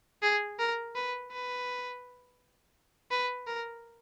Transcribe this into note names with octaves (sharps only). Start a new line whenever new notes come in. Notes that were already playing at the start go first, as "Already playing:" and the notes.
G#4
A#4
B4
B4
B4
A#4